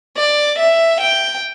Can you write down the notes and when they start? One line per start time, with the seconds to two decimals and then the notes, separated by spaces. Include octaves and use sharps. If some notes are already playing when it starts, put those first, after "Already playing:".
0.17 D5
0.59 E5
1.01 G5